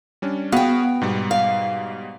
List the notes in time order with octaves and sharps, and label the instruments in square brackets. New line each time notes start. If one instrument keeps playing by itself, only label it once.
[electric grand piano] G3 C#4 D4
[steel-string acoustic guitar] B3 G5 [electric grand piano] F#4 G#4 F5
[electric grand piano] G#2 B2 G3
[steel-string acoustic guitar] F5